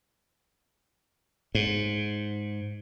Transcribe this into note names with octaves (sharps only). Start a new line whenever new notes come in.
G#2